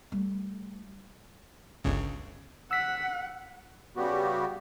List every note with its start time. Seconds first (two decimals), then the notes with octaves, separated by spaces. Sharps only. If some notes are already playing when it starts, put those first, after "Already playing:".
0.12 G3 A3
1.84 G1 C#2 C#3
2.71 F#5 E6 B6
3.97 C#3 G3 B3 F#4 G4